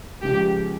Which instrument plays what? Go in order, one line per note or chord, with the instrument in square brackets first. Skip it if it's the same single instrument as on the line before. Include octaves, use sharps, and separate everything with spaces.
[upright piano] C#2 C#3 F3 [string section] G4